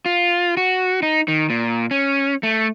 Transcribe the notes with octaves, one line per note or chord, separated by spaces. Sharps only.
F4
F#4
D#4
D#3
A#2
C#4
A3